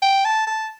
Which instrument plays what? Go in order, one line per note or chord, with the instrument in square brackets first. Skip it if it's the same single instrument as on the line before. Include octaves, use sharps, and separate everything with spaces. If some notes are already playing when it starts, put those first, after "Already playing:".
[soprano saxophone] G5
A5
A5